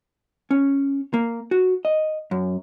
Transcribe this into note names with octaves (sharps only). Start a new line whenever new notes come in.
C#4
A#3
F#4
D#5
F#2